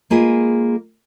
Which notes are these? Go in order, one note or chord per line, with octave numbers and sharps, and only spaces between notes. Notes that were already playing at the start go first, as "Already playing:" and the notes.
G#3 A#3 F4 G#4 B4